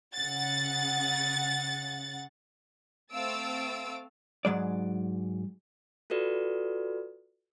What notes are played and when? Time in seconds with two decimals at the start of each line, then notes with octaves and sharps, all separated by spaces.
0.15 C#3 F#5 A6
3.13 A3 C4 F5 E6 A6 D7
4.45 G#2 F#3 G#3 D5
6.10 F4 F#4 A4 B4 D5